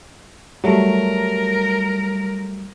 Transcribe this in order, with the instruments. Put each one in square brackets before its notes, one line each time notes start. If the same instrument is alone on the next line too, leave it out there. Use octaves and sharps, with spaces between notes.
[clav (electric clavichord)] F#3 A3 [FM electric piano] G3 [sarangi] A#4